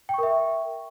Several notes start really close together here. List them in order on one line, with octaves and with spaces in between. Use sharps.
G5 C#6 A#4 E5